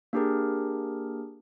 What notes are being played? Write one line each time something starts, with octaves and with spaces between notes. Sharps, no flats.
A#3 D4 G4 G#4 A#4